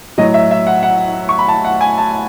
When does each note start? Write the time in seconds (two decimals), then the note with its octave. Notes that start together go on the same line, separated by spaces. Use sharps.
0.18 A2 F#3 D#5
0.34 E5
0.51 E5
0.67 F#5
0.83 F#5
1.29 C#6
1.39 B5
1.48 A5
1.65 F#5
1.81 G#5
1.98 A5